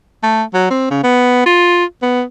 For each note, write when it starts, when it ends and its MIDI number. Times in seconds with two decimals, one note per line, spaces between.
0.23 0.43 57
0.54 0.67 54
0.71 0.87 60
0.91 0.99 49
1.04 1.46 59
1.46 1.85 65
2.02 2.23 59